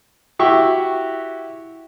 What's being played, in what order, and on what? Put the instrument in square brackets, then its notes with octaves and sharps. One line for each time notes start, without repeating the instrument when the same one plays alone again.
[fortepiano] E4 F#4 G4 E5 C#6